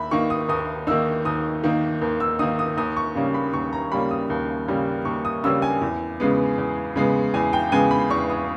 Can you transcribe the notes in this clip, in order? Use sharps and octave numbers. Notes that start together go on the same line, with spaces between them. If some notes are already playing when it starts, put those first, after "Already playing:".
Already playing: D#2 E5 B5
D#3 A#3 D#4 C#6
D#6
D#2 D#6
D#3 A#3 D#4 E6
D#2 D#6
D#3 A#3 D#4
D#2
E6
D#3 A#3 D#4 D#6
D#6
D#2 D#6
C#6
C#3 G3 A#3 C#4
B5
D#2 C#6
A#5
C#3 G3 A#3 C#4 B5
D#6
D#2
C#3 G3 A#3 C#4
D#2 C#6
D#6
C#3 G3 A#3 C#4 E6
G#5
E2
C#3 G#3 B3
E2
C#3 G#3 B3
E2 G#5
G5
C#3 G#3 B3 G#5
B5
E2 C#6
D#6